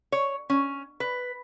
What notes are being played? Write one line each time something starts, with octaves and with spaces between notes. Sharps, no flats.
C#5
C#4
B4